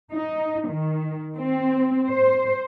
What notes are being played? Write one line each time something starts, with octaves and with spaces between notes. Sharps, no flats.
D#4
D#3
C4
C5